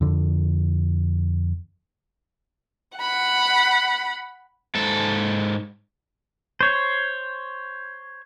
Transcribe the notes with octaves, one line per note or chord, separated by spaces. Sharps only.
F2 D3
F#5 B5
G#2 A4
C5 C#5